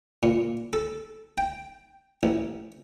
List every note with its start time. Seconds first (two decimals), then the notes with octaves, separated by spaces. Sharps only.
0.23 A#2
0.73 A4
1.38 G5
2.23 A1